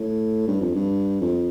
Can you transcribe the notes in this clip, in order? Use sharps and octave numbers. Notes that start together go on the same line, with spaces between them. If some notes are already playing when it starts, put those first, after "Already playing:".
Already playing: A2
G2
F2
G2
F2